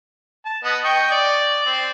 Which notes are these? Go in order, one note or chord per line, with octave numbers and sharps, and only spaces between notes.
A5
B3 D#5
D#5 G5 C#6
D5
C4